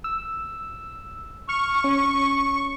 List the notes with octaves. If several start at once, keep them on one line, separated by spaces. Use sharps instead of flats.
E6
C#6 F6
C#4